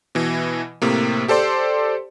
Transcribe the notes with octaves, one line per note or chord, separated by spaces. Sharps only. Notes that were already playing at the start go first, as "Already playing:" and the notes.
B2 E3
A2 C3 A#3
G4 A4 C5 D5 C6